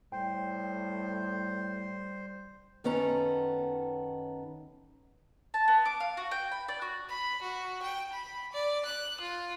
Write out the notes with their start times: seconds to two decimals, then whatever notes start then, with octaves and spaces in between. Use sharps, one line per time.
0.12 A2 G3 C5 G5
2.84 F#2 D#3 B3 C#4 A4 A#5
5.54 A5
5.68 B3
5.85 D6
6.00 F5
6.17 F#4
6.31 G5
6.52 B5
6.68 D5
6.82 F#4
7.09 B5
7.42 F#4
7.83 G5
8.13 B5
8.53 D5
8.85 F#6
9.21 F4